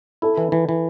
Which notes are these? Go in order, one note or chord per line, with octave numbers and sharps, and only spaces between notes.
E4 A4
E3
E3
E3